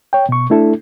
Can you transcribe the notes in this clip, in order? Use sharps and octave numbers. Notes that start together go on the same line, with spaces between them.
C#5 G5
B2 C#6
A3 D4 E4 A4